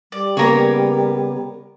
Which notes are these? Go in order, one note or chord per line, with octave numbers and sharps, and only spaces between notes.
G3 D5
C#3 A#3 B3 A#4 C#5